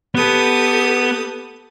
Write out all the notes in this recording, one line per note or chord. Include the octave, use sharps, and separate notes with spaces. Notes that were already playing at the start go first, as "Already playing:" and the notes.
B3 G4 A4 B4 D#6